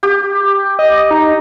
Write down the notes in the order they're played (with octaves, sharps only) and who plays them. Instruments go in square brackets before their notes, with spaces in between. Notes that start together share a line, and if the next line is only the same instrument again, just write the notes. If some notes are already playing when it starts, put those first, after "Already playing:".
[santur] G4
[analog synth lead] D#5
D#4